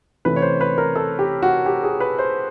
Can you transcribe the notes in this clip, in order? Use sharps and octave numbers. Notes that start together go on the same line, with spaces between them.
C3 E3 A3 C#4 B4
C#5
C5
B4
A#4
A4
G4
F#4
G4
G#4
B4
C5